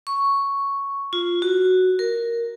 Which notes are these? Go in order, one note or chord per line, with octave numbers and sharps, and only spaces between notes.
C#6
F4
F#4
A#4